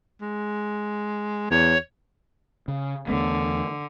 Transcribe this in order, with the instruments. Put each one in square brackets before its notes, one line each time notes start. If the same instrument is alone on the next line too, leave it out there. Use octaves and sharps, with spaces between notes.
[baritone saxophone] G#3
[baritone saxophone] E2 [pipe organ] C#5
[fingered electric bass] C#3
[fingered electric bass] E2 A3 B3 [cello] D3